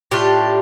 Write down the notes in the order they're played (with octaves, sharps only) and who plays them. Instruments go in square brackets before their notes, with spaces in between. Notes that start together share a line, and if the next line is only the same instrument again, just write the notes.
[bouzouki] A2 A3 D4 F4 G4